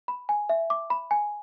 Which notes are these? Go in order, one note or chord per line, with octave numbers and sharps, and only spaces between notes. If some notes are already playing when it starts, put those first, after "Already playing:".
B5
G#5
E5
D6
B5
G#5